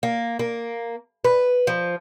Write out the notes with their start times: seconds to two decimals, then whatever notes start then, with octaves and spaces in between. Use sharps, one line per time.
0.03 A#3
0.39 A#3
1.25 B4
1.67 F3